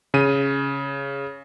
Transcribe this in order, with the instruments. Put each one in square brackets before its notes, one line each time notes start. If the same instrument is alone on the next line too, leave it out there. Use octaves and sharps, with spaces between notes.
[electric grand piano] C#3 D#7